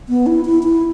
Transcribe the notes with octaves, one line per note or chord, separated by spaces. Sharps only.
B3
E4
E4
E4